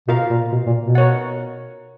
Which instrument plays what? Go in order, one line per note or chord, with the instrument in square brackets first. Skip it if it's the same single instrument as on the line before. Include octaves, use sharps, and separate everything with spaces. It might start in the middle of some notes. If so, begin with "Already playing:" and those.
[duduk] B2 [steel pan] F4 A#4 F5
[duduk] A#2
B2
A#2
B2
[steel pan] A#4 C#5 F#5